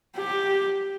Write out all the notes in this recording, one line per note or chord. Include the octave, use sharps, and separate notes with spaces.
G4